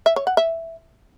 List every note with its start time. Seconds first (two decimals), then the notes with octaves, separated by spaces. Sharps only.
0.06 E5
0.16 C#5
0.27 F#5
0.37 E5